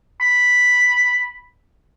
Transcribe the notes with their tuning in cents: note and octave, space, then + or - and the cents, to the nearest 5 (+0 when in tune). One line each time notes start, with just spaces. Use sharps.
B5 +0